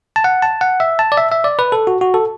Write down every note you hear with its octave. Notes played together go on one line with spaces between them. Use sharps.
A5
F#5
A5
F#5
E5
A5
D5
E5
E5
D5
B4
A4
F#4
F#4
A4